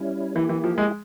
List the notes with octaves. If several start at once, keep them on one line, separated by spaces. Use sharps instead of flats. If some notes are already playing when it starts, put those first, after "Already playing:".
Already playing: G3 C#4 E4
E3 A#3 E4 G4
E3
F3
G#3